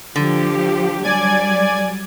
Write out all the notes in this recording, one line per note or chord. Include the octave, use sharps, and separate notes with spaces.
D3 F3 G4
F#3 G3 D5 G#5 G#6